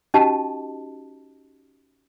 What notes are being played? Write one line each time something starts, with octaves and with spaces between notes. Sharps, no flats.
C#4 D#4 F#4 G4 D#5 A5